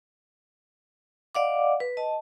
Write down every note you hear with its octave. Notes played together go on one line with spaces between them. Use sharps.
D5 D#5 F5 F#5 D6
B4
D#5 A5